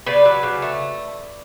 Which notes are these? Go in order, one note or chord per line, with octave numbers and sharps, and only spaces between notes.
C#3 B4 D5
F#3
C#3
A3